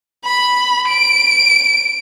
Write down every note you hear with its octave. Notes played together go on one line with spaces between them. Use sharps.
B5
D7